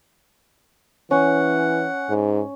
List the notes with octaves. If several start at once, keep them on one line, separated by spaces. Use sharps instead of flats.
E3 C#4 F#5
G#2